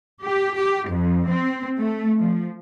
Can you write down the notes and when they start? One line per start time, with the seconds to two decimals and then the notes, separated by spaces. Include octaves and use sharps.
0.24 G4
0.57 G4
0.90 F2
1.29 C4
1.77 A3
2.19 F3